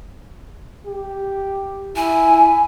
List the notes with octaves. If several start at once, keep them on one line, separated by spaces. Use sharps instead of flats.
G4
E4 G#5